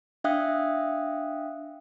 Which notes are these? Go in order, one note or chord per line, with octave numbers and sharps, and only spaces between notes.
D4 E5 F5 G5 D#6 F#6